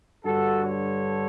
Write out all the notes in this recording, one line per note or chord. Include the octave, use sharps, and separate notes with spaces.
G2 D3 F#4 A4
A4 C#5